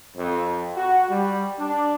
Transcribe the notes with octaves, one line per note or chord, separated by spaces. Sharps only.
F2
F#4
G3
D4